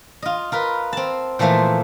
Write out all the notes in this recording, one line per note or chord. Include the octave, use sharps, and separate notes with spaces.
F4 D#5
F4 A#4 B4
C4 A5
A#2 E3 F3 A3 C5 E5